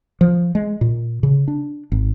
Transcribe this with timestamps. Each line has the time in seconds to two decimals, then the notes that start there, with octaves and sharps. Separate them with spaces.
0.21 F3
0.55 G#3
0.81 A#2
1.23 C#3
1.48 D4
1.92 G#1